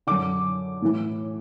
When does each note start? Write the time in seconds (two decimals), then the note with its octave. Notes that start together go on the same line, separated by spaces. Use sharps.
0.07 F#2 D3 D6
0.82 A2 E3